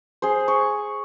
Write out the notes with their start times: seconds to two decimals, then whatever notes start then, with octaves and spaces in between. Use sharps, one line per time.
0.22 G#4 C5
0.48 C#6